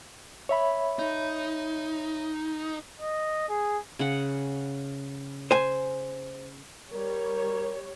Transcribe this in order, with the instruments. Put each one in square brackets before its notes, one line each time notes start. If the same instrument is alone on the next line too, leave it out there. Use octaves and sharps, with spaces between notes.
[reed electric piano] C#5 E5 B5
[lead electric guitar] D#4
[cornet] D#5
G#4
[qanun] C#3 F#5
[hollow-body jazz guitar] C5 G#5
[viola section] G3 C#5 [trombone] A#4